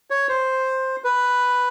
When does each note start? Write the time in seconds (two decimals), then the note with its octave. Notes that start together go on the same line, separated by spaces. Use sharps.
0.10 C#5
0.29 C5
1.04 B4